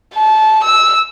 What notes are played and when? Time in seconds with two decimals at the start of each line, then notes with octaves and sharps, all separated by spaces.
0.15 A5
0.64 E6